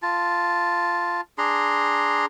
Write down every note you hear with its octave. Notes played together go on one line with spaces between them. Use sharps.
F4 A5
D4 G#4 A#5 C6